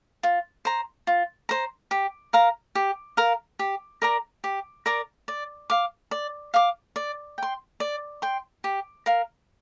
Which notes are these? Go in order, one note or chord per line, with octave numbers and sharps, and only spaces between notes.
F4
C5 A#5
F4
C5 A#5
G4
A#4 F5 A#5
G4
A#4 F5 A#5
G4
A#4 D5 A#5
G4
A#4 D5 A#5
D5
F5 D6
D5
F5 D6
D5
G5 C6
D5
G5 C6
G4
A#4 F5